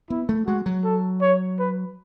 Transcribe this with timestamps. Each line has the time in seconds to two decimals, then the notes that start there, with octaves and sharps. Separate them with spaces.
0.10 B3 E4
0.29 A3
0.46 G#3 F#4
0.66 F#3
0.84 A4
1.21 C#5
1.59 B4